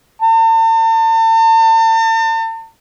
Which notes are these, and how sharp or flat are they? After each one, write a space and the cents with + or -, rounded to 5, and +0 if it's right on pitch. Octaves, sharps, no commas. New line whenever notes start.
A5 +40